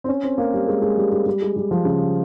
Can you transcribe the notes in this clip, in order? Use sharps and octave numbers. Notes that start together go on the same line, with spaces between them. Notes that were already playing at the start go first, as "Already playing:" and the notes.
C4
C#4
C4
A#3
G3
G#3
G#3
G3
G3
G3
G#3
G3
F3
C#3